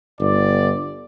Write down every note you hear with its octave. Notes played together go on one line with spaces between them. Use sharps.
G1 D5